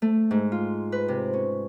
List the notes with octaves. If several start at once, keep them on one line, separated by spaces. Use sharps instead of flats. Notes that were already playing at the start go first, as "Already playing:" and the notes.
A3
G#2
F4
B4
C3
C#4